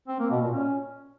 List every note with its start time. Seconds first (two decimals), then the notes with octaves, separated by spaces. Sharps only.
0.08 C4
0.19 A#3
0.31 B2
0.42 A#2
0.53 C#4